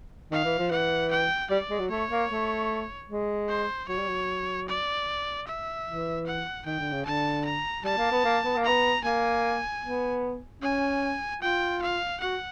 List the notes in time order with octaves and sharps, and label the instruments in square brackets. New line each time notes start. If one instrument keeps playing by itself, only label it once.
[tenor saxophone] D#3 [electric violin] F5
[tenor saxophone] E3
F3
[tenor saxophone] E3 [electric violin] F#5
[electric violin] G5
[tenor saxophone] G3 [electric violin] D5
[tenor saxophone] G#3
F#3
[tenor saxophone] A3 [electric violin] C#5
[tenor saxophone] A#3
A3
G#3
[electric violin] C5
[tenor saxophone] F#3 [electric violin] C#5
[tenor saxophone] G3
F#3
[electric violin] D5
E5
[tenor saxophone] E3
[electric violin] F#5
[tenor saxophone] D#3 [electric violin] G5
[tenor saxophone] D3
C#3
[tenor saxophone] D3 [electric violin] A5
[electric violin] A#5
[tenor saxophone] G3 [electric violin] A5
[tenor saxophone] A#3
B3
A#3
B3
A#3
[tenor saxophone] B3 [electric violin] A#5
[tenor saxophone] A#3 [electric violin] G#5
[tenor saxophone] B3
[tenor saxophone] C#4 [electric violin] G#5
[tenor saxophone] F4 [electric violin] G5
[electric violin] F5
[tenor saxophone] F#4 [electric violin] F#5